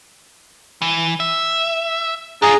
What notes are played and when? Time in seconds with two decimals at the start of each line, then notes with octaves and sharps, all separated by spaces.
0.82 E3
1.20 E5
2.42 D4 F4 G#4 A#5